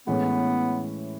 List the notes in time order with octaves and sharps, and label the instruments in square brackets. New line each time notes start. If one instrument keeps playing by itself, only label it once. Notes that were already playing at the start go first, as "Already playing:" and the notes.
[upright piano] A2 E3 G#3 C#4 [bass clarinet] B3